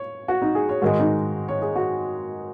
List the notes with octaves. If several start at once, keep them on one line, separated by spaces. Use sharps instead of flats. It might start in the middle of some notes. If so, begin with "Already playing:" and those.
Already playing: C#5
F#4
D#4
G#4
C#5
G#2 D#3 G#3 F#4
D#4
C#5
G#4
F#4